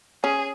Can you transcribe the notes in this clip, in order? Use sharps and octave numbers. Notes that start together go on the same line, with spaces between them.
C#4 G#4